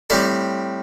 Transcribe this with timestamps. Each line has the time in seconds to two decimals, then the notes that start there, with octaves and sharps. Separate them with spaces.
0.10 A2 G3 C4 A4 D5